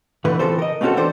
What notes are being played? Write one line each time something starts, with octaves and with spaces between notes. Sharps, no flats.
A#2 D3 E3 A3 B4 B5
C#3 E3 F3 C4 A4 C5
A#4 D#5
A3 A#3 C4 C#4 F#4 A4
E3 D4 A4 C5